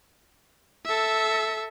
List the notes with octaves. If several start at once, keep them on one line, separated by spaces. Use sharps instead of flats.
A4 E5